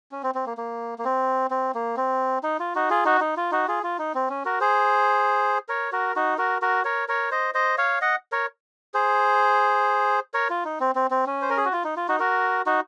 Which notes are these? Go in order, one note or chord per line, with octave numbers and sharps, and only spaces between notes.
C#4
C4
C4
A#3
A#3
A#3
C4
C4
A#3
C4
D#4
F4
D#4 F#4
F4 G#4
D#4 F#4
D#4
F4
D#4 F#4
F4 G#4
F4
D#4
C4
C#4
F#4 A#4
G#4 C5
A#4 C#5
F#4 A#4
D#4 F#4
F#4 A#4
F#4 A#4
A#4 C#5
A#4 C#5
C5 D#5
C5 D#5
C#5 F5
D#5 F#5
A#4 C#5
G#4 C5
A#4 C#5
F4
D#4
C4
C4
C4
C#4
C5
A#4
G#4
F#4
F4
D#4
F4
D#4 F#4
F#4 A#4
D#4 F#4